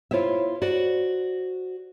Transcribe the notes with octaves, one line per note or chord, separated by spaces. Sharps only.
E4 F4 C5 C#5 E5
F#4 C5 D5